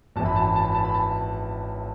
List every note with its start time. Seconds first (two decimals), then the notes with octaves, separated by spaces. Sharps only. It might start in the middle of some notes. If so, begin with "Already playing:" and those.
0.16 G#1 F#2 E3 A5
0.26 B5
0.36 A5
0.46 B5
0.56 A5
0.65 B5
0.75 A5
0.85 B5
0.94 A5